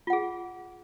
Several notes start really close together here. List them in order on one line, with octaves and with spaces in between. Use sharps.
F4 F#5 G#4